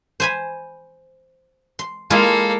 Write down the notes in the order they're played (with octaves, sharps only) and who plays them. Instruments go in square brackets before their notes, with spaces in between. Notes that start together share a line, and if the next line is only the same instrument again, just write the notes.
[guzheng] C5 G#5 B5
C6
[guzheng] G#3 E4 F4 [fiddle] A#3 A4